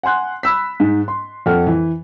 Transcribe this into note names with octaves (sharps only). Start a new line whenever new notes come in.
F#5 G#5 C6 F#6
B5 E6 B6
G#2
C6
F2 A4 F#5 F6
E3